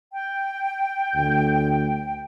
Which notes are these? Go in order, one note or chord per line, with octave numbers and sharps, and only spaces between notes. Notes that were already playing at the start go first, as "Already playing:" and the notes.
G5
D2